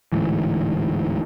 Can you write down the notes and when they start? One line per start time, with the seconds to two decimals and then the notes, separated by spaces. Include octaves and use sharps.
0.12 D1 D2 G#2 E3